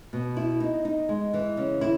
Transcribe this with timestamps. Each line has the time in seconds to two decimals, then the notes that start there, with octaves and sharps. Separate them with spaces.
0.13 B2
0.37 E4
0.60 D#4
0.85 D#4
1.09 G#3
1.34 E3
1.57 C#3
1.81 E4